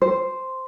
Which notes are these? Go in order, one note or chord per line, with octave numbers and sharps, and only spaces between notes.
C5